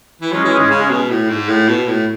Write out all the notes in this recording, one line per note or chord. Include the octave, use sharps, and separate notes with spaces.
E3
F#3 G#3 C#4 G#4
E3
G#2
C#3
B2
A2
G#2
A2
B2
A2